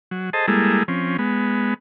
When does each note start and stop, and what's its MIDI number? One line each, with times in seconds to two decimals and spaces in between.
0.11 0.30 54
0.33 0.46 68
0.33 0.46 69
0.33 0.46 72
0.33 0.46 75
0.33 0.46 81
0.48 0.83 55
0.48 0.83 56
0.48 0.83 58
0.48 0.83 64
0.48 0.83 68
0.48 0.83 69
0.88 1.17 53
0.88 1.17 60
0.88 1.17 61
1.18 1.74 56
1.18 1.74 59